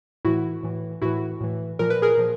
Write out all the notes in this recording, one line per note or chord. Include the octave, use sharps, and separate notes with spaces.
A2 E3 E4 F#4
A2 E3
A2 E3 E4 F#4
A2 E3
A#2 F3 A#4
B4
G#4 A#4
A#2 F3